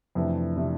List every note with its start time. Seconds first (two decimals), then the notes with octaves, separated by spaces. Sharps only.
0.15 F2 C3 E3 A3 D4
0.57 C3 E3 A3 D4